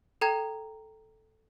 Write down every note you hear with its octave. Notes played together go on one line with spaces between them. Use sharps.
A4 G5 A#5 G#6